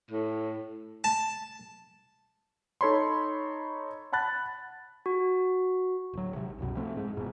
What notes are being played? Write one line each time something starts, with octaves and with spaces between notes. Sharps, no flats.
A2
A5
D#4 A4 C#5 B5 C6
F#5 A5 B5 F#6 A6
F#4
D1 F#3
G#1 C3
C2 F#2 B2
F3 A3 C4
G#2 G#3
D#1 F2 G#2 B2